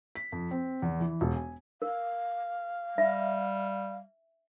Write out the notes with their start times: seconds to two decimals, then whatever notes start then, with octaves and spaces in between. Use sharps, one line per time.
0.15 B6
0.32 F2
0.51 C4
0.82 E2
1.00 E3
1.21 E1
1.36 G#5
1.82 A#4 F5
2.98 G3 E5